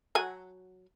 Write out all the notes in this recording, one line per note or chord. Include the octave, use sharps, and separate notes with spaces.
F#3 F#4 G#5